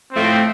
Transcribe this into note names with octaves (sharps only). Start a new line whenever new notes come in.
A2 F3 A3 C4